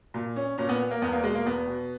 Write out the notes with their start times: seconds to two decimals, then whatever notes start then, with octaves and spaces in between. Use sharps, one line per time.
0.14 A#2
0.36 C#4
0.58 A#2 C#4
0.69 B3
0.91 A#3
1.02 E2 B3
1.13 A#3
1.24 B2 G#3
1.35 A#3
1.46 E2 B3
1.67 B2